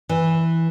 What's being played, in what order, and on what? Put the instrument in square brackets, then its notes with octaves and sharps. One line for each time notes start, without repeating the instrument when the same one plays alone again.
[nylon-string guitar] E3